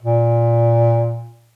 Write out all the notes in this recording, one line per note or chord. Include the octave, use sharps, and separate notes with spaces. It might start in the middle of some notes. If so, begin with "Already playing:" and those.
A#2